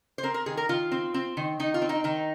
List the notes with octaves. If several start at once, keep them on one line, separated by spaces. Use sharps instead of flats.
C5
C4 A#4
A#4
D#3 G#4
A#4
D#3 F4
C4
C4
D#3
D#3 D#4
F4
C4
D#4
D#3 D#4